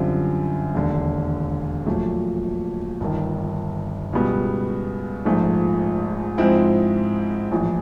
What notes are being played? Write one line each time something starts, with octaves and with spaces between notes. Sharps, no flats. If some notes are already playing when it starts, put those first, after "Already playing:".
Already playing: F#2 D3 G3 C4 F4
E1 D#2 D3
A#1 A#2 F#3 A3
G1 G2 D#3
C#2 B2 G3 B3
A#1 G#2 F3 A3
G#2 F3 G#3 C4 E4
A#1 A2 E3